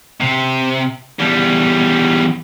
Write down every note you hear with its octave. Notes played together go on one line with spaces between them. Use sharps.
C3
E2 G3